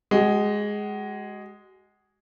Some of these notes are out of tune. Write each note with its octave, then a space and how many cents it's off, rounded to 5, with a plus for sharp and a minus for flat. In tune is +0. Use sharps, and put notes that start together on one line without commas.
G#3 +0 F#4 +35